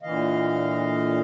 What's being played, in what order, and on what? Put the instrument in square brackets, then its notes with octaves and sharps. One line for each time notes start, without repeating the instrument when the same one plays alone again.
[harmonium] A#2 D3 E3 D#5 F5